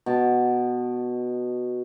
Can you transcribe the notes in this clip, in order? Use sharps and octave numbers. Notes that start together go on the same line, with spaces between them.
B2 A5